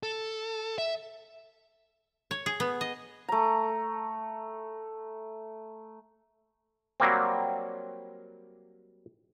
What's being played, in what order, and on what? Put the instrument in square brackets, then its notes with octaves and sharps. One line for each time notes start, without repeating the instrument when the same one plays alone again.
[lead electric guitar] A4
E5
[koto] C#5
G#4
B3
D#5
[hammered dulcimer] A3 A#5
[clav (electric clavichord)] F#3 G3 A#3 C4